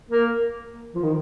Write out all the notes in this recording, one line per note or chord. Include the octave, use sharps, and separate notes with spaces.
A#3
F3
D#3